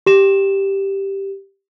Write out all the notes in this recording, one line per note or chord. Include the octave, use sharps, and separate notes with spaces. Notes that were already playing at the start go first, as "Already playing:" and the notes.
G4 E7